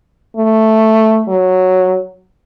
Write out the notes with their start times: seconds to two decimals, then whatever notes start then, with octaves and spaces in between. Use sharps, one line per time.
0.37 A3
1.28 F#3